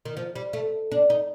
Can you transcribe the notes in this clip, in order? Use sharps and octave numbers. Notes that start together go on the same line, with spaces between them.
D#3
F3
G3
A3
D4
D#4